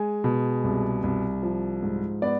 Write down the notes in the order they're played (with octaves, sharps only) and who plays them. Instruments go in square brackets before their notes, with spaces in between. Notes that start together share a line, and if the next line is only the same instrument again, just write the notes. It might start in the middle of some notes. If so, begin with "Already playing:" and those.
Already playing: [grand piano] G#3 G#5
B2
C2
C2
F3
G#2
B3 D5